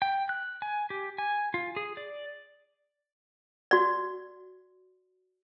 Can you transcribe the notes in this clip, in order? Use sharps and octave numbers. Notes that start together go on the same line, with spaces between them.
G5
F#6
G#5
G4
G#5
F4
G#4
D5
F#4 D5